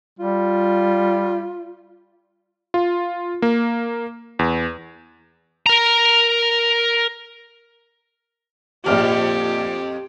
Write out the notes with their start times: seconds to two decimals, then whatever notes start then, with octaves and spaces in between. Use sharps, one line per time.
0.19 G3 F4
2.74 F4
3.42 A#3
4.39 E2
5.66 A#4 A#5
8.86 A#1 F2 G4 D5 F6